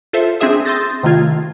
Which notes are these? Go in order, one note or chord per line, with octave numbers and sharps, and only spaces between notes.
F4 A4 C5 E5
C4 D4 G#4 E5 D#6
C6 D#6 E6 G6 A6 A#6
C3 D#3 A3 F4 G#6